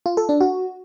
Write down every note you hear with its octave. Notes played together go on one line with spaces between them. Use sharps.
F4
A4
D4
F#4